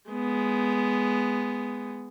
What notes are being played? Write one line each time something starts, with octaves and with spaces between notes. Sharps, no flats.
G#3 B3